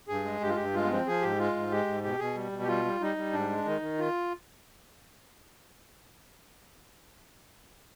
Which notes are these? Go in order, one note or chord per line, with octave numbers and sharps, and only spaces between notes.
G2 G#4
G#3
G2 G4
F4
G2 G4
G#3 F4
B3
F3 C4
F3 G#4
G#2 G4
G#3 F4
G#2
G#3 G4
G#2
B2 G4
B2 G#4
G3
B2
G4
G3 F4
G3
G3 D#4
G3
G#2 D4
G#3
D#3 D#4
D#3
F4